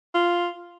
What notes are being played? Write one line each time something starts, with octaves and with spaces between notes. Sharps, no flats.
F4